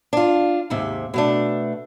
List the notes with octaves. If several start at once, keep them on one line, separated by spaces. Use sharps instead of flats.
D4 F4
D#2 G#2 C3 E5
B2 A3 D4